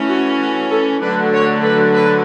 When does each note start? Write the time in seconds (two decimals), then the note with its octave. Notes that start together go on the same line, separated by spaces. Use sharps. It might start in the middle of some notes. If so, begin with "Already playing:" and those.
Already playing: E3 A3 C#4
0.08 F#4
0.40 F#4
0.70 A4
1.01 D3 F#3 A3 D4 B4
1.32 C#5
1.63 B4
1.94 B4